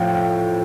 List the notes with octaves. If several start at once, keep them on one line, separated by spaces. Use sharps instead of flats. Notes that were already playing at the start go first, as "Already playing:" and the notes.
Already playing: A2 F3 F5 G5
F5